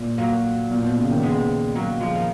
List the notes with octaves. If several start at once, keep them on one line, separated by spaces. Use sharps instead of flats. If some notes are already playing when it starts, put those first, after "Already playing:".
Already playing: A#2
F#3 A#3
A#2
B2
C#3
D#3
D#3 G#3 B3
F#3 A#3
F3 G#3
D#3